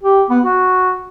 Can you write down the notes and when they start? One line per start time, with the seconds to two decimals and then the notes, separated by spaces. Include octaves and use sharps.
0.03 G4
0.30 B3
0.45 F#4